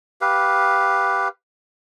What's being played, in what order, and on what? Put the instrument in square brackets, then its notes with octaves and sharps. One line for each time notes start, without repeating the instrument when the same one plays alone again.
[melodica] G4 B4 F5